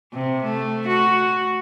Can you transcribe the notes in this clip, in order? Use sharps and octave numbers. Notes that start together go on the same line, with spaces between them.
C3
A3
F#4